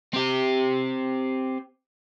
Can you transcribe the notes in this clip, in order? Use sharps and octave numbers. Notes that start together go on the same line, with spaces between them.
C4 G4